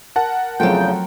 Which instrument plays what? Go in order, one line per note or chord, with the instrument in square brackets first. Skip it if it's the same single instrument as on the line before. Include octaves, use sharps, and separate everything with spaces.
[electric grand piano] A#4 F#5 A5
[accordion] E2 C#3 G6 [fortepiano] F3 A3 C4 [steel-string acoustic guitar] F#3 G5